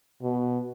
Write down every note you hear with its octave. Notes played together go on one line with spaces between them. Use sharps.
B2